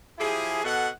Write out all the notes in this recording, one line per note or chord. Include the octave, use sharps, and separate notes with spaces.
F3 E4 G4 G#4
B2 A4 D#5 F#5